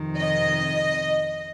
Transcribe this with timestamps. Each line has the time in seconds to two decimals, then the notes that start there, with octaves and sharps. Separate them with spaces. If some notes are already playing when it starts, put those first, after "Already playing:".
Already playing: F2 C3 D#3
0.19 D#5